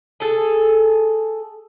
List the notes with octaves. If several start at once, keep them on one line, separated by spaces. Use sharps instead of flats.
G#4 A4